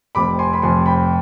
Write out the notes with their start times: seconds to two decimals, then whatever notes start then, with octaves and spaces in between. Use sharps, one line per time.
0.15 F1 F2 C3 B5 D6
0.39 G#5 C6
0.53 B5
0.62 F1 F2 C3 G#5 C6
0.86 G5 B5